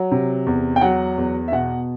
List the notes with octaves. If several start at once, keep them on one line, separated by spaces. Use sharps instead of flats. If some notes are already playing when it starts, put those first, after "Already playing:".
Already playing: F#3
C3
E2
G5
F#3 F#5
E2
E5
B2 F#5